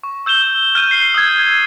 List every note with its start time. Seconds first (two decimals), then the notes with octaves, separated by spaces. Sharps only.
0.03 C#6
0.26 E6 G6 E7 G7
0.75 F6 G6 D#7
0.91 C7
1.14 D#6 E6 G#6